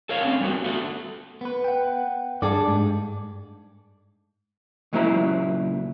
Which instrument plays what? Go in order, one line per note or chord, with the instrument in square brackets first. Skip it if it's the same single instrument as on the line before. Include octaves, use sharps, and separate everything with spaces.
[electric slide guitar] A4 A#4 C#5 F5
A3 C4 C#4
G3 B3 F#4
A3 F#4 A4
[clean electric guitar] B3 B4
[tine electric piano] F#5 G5
[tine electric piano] G2 [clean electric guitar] G#4 A4 D5
[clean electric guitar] G#2
[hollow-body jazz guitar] C#2 A#2 F#3 C4 E4 A#5